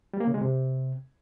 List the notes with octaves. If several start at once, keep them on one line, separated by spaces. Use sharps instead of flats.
G3
A#3
C#3
G#3
C3